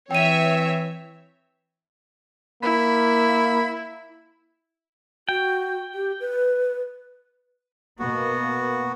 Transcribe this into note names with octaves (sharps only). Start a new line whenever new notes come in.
E3 C4 C#5 E5 G5 D#7
A#3 E4 B5
F#4 G5
G4
B4
B2 A#3 B3 F#4